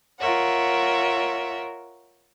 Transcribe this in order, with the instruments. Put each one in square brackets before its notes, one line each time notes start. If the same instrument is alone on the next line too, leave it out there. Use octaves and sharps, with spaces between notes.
[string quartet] F4 A#4 C#5 E5 F#5